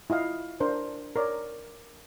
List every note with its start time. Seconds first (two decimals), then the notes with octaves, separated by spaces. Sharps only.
0.10 E4 F4 D#5 F5
0.60 D4 A#4 C5
1.16 A#4 C#5 D5